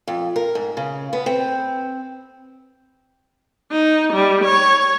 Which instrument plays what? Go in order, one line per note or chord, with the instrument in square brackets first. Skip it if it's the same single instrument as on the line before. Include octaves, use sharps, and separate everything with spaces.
[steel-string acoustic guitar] F2
A#4
G#2
C#3
B3
C4
[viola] D#4
G3
C#5